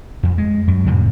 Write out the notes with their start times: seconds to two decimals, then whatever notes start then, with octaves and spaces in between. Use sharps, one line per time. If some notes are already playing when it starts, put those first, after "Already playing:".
0.23 F2
0.38 G#3
0.68 F#2
0.86 F2 A2 C3